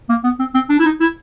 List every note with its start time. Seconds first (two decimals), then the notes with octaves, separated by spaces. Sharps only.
0.09 A#3
0.24 B3
0.39 C4
0.55 C4
0.70 D4
0.79 E4
0.85 D#4
1.00 E4